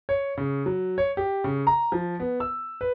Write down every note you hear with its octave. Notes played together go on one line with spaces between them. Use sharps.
C#5
C#3
F#3
C#5
G4
C#3
A#5
F3
B3
E6
B4